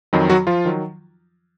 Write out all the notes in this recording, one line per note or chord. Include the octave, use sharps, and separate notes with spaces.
F2 D#3 F#3
F#3 F#4
F3 F4
D#3 F#3